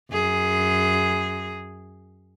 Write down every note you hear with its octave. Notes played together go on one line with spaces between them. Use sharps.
F#2 G#4